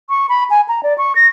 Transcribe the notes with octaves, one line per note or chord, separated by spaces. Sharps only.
C#6
B5
G#5
A#5
D5
C#6
A#6